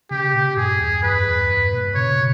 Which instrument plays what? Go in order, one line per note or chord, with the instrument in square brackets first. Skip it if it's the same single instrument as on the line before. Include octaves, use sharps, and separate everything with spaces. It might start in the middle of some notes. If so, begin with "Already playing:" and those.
[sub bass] C#3 [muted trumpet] G4
[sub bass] A#2
[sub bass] G2 [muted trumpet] G#4
[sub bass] E2
[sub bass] G2 [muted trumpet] B4
[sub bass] E2
G2
A#2
[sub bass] C#3 [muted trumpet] C#5
[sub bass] B2